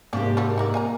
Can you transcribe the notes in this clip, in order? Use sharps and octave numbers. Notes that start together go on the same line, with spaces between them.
G#2 C3 F3 A#3 C#4 G4 D5
D4 F#4 A4
D#4 A#4 D5
F4 G#5 A#5